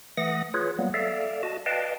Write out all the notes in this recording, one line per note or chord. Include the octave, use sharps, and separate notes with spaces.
E3 A3 F#5 D#6 A#6
F4 G#4 B4 C#5
F#3 G3 A#3 B3
A4 D5 E5 F5
F#4 D#5 A5
B4 D5 D#5 F5 G5 A5